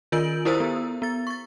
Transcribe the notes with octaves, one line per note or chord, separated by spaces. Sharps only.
D#3 F4 A#4 G6 D7 F#7
E4 G4 A#4 C5 D#6 E6
B3
B3 A6
C#6 A6